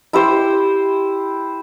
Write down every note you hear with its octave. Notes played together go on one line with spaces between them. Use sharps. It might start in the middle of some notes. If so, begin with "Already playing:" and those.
E4 G4 C5